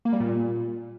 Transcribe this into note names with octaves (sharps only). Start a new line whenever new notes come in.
A#3
G3
A#2